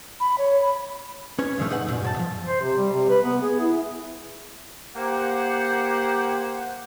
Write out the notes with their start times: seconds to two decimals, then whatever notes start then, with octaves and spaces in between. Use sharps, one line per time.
0.20 B5
0.38 C#5
0.61 B5
1.39 C#4 B4 C#5
1.58 G2 A#2 D3 D#3 F3 A3
1.70 D#4 G#4 B4 F#5
1.87 C#2 F#2 A#2
2.02 F#2 C#5 A5
2.16 C#3 F3
2.46 C5
2.61 C3
2.77 G3
2.93 C3
3.09 B4
3.25 B3
3.42 G#4
3.59 E4
4.97 A#3 G4 C5 F#5